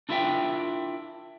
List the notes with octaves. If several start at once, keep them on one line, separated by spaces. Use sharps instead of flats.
D4 E4 F4 A#4 E5 G5